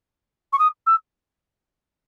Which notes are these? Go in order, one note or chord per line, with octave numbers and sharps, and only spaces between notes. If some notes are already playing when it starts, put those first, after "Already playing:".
C#6
D#6
E6